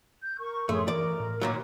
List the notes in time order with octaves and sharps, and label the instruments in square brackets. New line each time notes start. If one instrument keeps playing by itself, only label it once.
[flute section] G6
A#4 C#6
[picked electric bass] F#2 A2 F3 [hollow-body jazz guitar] A3 [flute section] G#4 C#5 C6
[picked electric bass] E3 [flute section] A#4 [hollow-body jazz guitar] D5
[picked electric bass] A2
[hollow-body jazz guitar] D#2 A#2 F#3